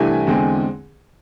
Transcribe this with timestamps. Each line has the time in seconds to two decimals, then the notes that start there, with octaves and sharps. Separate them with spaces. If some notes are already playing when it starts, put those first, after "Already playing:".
Already playing: C2 C3 E3 A3 D4 G#5
0.27 E2 D3 G#3 C4